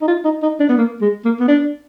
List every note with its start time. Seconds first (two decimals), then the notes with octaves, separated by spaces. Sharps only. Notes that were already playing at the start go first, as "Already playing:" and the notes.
0.01 D#4
0.08 F4
0.24 D#4
0.42 D#4
0.60 D4
0.69 B3
0.77 A#3
1.01 G#3
1.25 A#3
1.40 B3
1.48 D4